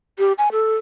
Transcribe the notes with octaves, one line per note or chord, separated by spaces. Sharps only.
G4
G#5
A4